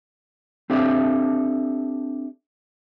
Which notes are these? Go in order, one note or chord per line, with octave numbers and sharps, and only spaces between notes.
C4 D4 G4 A4 D5 E5